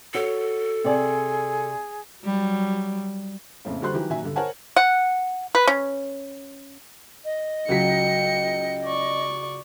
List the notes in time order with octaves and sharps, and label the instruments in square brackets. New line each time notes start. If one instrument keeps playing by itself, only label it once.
[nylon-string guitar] F#4 C#5 [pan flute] A4
[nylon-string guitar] C3 D5 [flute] G#4
[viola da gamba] F#3 G3
[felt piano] F#1 F2 A2 C#3
D3 G3 F#4 C5 C6 F#6
D#3 E3 F#3 G4
A#2 D#3 F#3 E5 G#5
G2 D3
A#4 C5 C#5 F#5 G#5 A5
[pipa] F#5
B4
C#4
[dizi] D#5
[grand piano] C#2 F#3 B6 [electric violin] G5 C#7
[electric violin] D5 C#6